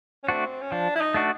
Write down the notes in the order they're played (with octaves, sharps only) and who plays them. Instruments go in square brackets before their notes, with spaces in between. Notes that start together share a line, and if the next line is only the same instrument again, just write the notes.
[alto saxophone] C#4
[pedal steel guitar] A3 D4 F#4 [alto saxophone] C4
[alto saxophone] C#4
[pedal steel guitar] F3 [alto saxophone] D4
[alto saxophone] E4
D#4
[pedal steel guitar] A3 D4 F#4